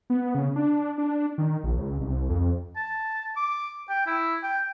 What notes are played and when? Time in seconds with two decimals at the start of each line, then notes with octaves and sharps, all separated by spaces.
0.10 B3
0.35 C#3
0.56 D4
0.98 D4
1.38 D#3
1.64 A#1
1.77 C#2
2.01 C2
2.29 F2
2.76 A5
3.37 D6
3.89 G5
4.07 E4
4.43 G5